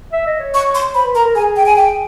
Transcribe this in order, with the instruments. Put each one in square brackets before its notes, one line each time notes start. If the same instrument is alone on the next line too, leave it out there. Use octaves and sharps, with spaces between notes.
[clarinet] E5
D#5
C#5
[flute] C#6
C6
[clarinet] C5 [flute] B5
[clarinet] B4
[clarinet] A#4 [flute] A#5
[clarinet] A#4
[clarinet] G#4 [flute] G#5
[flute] G5
G#5
G5